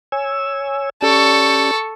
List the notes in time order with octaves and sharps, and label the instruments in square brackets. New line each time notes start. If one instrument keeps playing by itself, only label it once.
[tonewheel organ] C#5 G#5 E6
[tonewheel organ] C#4 G4 D5 [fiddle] A4 C#6